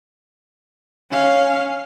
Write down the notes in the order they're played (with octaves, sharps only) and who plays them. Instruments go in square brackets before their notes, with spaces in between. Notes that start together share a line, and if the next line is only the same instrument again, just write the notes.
[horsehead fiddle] C#4 F5